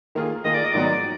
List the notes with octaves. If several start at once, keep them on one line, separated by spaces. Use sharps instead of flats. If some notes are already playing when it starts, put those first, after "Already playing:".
D#3 A#3 F4 G#4
D#3 A#3 F4 G#4 D#5
D5
D#5
G#2 D#3 F#3 B3 D5